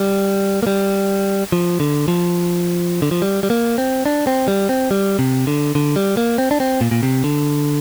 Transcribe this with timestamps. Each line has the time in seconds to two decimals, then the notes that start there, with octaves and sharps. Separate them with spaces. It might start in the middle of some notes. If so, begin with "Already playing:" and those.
Already playing: G3
0.63 A#3
0.67 G3
1.52 F3
1.80 D3
2.08 F3
3.02 D3
3.11 F3
3.22 G3
3.43 G3
3.50 A#3
3.78 C4
4.06 D4
4.27 C4
4.48 G3
4.69 C4
4.91 G3
5.19 C3
5.47 D3
5.75 D3
5.96 G3
6.17 A#3
6.38 C4
6.51 D4
6.60 C4
6.81 A#2
6.91 A#2
7.03 C3
7.24 D3